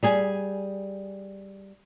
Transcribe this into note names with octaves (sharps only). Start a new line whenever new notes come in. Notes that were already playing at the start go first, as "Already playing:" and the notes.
G3 G#4 G#5